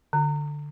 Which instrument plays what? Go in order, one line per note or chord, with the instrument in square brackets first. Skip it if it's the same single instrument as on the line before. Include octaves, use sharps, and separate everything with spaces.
[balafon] D3